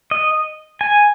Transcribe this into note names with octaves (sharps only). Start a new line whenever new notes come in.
D#5
G#5